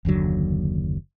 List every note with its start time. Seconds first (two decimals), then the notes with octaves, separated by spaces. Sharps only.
0.05 F#1 D#2 D3 F#3